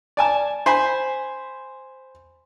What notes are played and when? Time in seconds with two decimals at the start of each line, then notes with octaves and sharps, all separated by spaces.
0.17 D5 G#5 A5
0.66 C5 G#5 B5